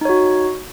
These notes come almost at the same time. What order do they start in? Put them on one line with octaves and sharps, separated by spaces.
D#4 C#5 F#4